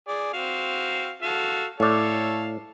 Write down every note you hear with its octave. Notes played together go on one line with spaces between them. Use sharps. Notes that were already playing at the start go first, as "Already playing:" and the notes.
G#4 D5
C4 F#4 F5
F#4 A4 F5
A2 A4 C#5 D5 F5